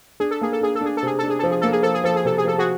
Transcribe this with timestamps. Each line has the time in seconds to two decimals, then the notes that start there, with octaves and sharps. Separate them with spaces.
0.20 D4 G#4
0.31 A4
0.41 A#3 G#4
0.53 A4
0.61 D4 G#4
0.75 A4
0.81 D4 G#4
0.97 A4
1.03 C3 G#4
1.19 D4 A4
1.30 G#4
1.39 F3 A4
1.51 G#4
1.62 A#3 A4
1.73 G#4
1.83 F3 A4
1.94 G#4
2.04 F3 A4
2.16 G#4
2.25 C3 A4
2.38 G#4
2.45 F3 A4
2.58 F#4 G#4